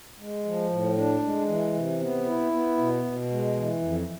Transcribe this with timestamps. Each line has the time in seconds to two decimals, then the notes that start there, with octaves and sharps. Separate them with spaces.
0.19 G#3
0.45 F3
0.70 A2
0.97 D4
1.23 G#3
1.48 E3
1.74 C3
2.01 B3
2.26 E4
2.52 B3
2.77 B2
3.04 B2
3.30 G#3
3.56 E3
3.81 F2